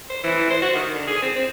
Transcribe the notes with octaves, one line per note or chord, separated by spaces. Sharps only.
C5
E3
C5
F#4
D#3
D3
G#4
C4
C4